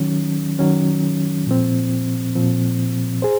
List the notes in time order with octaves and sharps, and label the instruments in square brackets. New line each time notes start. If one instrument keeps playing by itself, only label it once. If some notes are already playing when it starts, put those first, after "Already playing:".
Already playing: [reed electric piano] D#3 F#3 C#4
D#3 F#3 C#4
A#2 F3 C4
A#2 F3 C4
G#4 C5